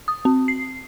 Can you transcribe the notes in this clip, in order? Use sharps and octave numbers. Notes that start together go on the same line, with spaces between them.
D#6
C4
C7